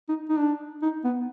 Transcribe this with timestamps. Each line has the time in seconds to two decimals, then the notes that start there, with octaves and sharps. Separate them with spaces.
0.09 D#4
0.29 D#4
0.39 D4
0.82 D#4
1.04 B3